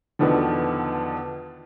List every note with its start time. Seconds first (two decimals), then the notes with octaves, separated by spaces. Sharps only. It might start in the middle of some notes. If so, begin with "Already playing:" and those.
0.19 E2 B2 D3 D#3 F3